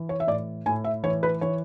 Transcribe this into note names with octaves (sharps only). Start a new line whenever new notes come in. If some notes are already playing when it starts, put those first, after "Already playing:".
Already playing: E3
C#5
E5
A2 D5
A2 G#5
E5
E3 C#5
B4
E3 C#5